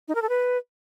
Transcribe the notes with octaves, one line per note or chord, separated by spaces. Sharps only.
D#4
A#4
A4
B4